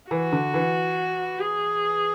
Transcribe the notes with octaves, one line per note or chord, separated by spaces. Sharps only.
E3 F#4
D3
E3
G#4